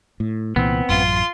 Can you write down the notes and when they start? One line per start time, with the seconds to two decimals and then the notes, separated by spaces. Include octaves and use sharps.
0.20 A2
0.56 C2 A#2 E3 B3 C4
0.89 A1 F#2 F4 C6